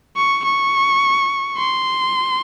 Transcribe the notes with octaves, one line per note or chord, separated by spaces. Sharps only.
C#6
C#6
C6